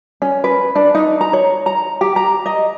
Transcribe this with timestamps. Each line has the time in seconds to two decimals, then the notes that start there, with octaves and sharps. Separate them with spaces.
0.22 C#4
0.44 B4
0.75 D4
0.95 D#4
1.21 A#5
1.33 C#5
1.66 A#5
2.01 G4
2.16 A#5
2.46 D#5